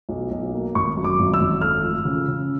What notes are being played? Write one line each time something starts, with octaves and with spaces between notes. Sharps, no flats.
B1
B1
A#3
G#1 C#6
F#2
D6
G#1
E6
G#1
A3 F6
F3
C#3
C#3